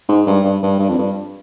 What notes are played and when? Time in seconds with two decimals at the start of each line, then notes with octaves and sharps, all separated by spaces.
0.09 G#2
0.26 G2
0.45 G2
0.63 G2
0.79 G2
0.89 F2
0.98 G2